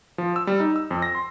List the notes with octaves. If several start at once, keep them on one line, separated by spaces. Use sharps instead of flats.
F3
E6
G3
D#4
E6
F2
A#6
C6